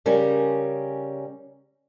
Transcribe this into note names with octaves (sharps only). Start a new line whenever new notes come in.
C#3 G3 C#4 A#4